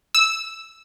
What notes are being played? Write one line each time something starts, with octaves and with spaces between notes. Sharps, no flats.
E6